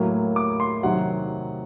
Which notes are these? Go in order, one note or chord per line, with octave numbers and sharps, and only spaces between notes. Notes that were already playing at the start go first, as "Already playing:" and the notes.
Already playing: A2 F#3 A#3
D6
C6
C3 D#3 F#3 F#5